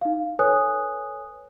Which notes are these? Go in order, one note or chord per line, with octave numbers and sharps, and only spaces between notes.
D#4 F5
A4 B4 C#5 G#5 D#6 F#6